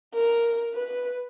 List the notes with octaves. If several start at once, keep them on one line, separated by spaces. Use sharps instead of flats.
A#4
B4